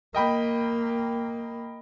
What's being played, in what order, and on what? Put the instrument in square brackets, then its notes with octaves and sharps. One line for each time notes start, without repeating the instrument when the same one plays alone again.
[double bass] A#3 [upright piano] D#5 G5 B5